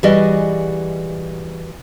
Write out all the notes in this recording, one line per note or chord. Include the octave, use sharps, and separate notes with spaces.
E3 G3 F#4 G#4 D5 D#5